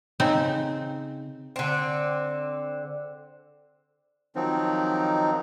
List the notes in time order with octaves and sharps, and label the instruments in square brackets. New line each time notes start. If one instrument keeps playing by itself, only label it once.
[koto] C#3 C4 D#4
[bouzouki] D3 C4
[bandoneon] D#3 F3 F#3 C4 D#4